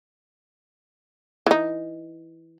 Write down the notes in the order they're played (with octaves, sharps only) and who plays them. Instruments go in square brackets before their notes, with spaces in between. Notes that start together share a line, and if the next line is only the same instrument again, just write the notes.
[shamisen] E3 D#4